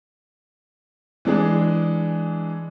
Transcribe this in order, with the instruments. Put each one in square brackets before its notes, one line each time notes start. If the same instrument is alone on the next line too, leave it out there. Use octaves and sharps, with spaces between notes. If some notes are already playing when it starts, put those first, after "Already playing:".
[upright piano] E3 G#3 D4 G#4